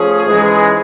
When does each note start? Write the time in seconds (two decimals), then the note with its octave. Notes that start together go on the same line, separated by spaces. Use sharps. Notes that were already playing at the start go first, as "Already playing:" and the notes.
Already playing: F3 A3 C#4 G#4
0.25 G#2 E3 G#3 C#4